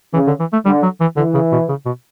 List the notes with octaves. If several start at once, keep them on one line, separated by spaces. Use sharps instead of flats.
C#3 E3
D3
E3
A3
D3 G3
F#3
E3
D3 E3
C#3
B2
C#3
B2